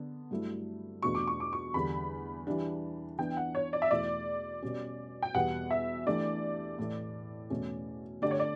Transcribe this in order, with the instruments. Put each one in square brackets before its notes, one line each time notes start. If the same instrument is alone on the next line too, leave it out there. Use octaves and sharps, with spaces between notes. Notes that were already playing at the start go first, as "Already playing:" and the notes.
Already playing: [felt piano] D3 B3 D4
G2 F#3 A3 E4
[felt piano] E2 B2 A3 D4 F#4 [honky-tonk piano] C#6
[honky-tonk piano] D6
C#6
D6
C#6
[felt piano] E2 D3 G3 [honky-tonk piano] B5
[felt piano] E3 G3 D4
[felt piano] E3 B3 D4 [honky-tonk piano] G5
[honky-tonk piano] F#5
C#5
D5
E5
[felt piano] E2 B2 A3 E4 [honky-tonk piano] D5
[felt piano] B2 G3 C#4
[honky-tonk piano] G5
[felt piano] E2 B2 G3 B3 [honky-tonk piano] F#5
[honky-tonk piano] E5
[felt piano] E3 A3 D4 G4 [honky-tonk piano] D5
[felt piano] A2 E3 A3
E2 B2 A3 C#4
[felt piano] D3 A3 D4 G4 [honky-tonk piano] D5
[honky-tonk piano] C#5
D5